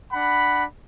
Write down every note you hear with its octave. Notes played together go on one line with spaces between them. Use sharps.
D4 F#5 B5